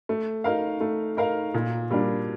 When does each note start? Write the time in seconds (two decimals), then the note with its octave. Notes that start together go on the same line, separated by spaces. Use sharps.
0.09 A3
0.44 D#4 A#4 F5
0.81 A3
1.17 D#4 A#4 F5
1.54 A#2
1.91 G3 A#3 D4